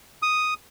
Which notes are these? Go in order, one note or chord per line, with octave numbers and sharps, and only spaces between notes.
D#6